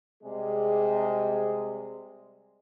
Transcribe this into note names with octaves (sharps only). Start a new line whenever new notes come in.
C3 G3 G#3 G#4